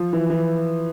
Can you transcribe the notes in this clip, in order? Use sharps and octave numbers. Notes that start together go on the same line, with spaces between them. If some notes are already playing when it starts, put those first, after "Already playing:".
Already playing: F3
E3
E3